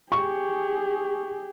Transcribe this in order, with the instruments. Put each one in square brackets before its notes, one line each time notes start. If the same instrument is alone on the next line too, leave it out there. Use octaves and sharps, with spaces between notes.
[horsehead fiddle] G4 G#4 [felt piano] C#6